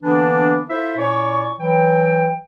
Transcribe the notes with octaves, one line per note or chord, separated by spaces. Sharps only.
D3 E3 A#3 B3 D4
E4 F4 A4 C5 E5
A#2 C#4 E4 C#5 D5 C#6
E3 F#3 G5